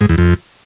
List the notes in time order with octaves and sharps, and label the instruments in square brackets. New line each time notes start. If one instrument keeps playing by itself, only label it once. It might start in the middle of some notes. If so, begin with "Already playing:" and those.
[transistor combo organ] G#2
E2
F2